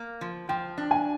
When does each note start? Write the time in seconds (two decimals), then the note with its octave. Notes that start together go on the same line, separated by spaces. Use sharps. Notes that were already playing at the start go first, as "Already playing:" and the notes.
Already playing: A#3
0.21 F3
0.49 F3 G5
0.78 D4
0.91 G#5